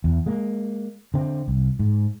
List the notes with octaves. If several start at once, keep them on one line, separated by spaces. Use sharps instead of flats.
E2
G#3 A#3
D3 C4
C2
G#2